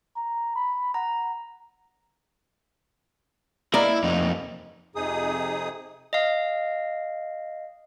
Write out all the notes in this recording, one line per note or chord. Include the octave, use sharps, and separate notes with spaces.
A#5
B5
F#5 A#5
A#3 E4 D5 D#5
F2 D#4
F2 C3 D#4 G#4 D#6
D#5 F5